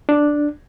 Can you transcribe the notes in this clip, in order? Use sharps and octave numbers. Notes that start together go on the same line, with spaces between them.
D4